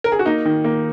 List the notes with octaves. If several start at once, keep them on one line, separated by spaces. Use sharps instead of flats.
A#4
G#4
F#4
A#3 D#4
D#3
A#3